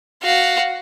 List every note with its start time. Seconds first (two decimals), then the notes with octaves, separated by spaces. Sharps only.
0.23 F#4 F5